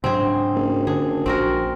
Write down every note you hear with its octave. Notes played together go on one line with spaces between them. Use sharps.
G#2 C#3 F#3 C4 D4 G#4
F#1
D3 G#4
A#1 C4 F#4 A#4